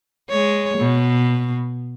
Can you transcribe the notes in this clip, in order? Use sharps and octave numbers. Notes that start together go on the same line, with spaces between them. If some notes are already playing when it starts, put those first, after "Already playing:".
G#3 C#5
B2